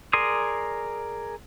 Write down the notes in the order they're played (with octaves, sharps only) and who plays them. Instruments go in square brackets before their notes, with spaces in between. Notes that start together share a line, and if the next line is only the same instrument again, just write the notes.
[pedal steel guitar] G#4 A#4 D5 C6 D#6